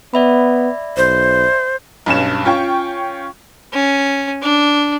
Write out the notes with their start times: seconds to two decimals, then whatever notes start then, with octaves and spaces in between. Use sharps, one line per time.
0.14 B3 D5 E5 B5
0.97 B1 C5
2.06 B1 G2 C#4 E7
2.45 C#4 F4 G5 C#6
3.73 C#4
4.42 D4